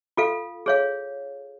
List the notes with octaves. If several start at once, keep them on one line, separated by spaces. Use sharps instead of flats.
F4 A4 F5
G#4 C#5 F5